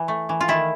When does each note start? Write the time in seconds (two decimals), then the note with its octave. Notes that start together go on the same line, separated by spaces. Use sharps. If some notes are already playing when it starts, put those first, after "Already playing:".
Already playing: E3
0.08 A3
0.29 E3
0.41 F4
0.48 D#3 E4